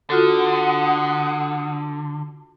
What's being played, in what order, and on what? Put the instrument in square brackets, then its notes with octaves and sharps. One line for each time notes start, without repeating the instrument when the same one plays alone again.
[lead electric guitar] D3 [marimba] F4 F#4 A4 [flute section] F#5 D#6